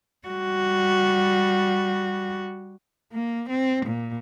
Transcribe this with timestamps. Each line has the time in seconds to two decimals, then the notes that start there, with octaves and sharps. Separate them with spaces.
0.27 G3 F#4
3.13 A#3
3.50 C4
3.86 A#2